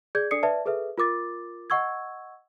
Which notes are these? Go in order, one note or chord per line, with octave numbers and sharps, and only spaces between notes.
G#4 D5 G6 G#6
D4 A4 D5 D#6 C7 C#7
B4 D5 E5 A5
G#4 A4 B4 E5
F4 A#4 D6 A6
D#5 F#5 C#6 E6 G#6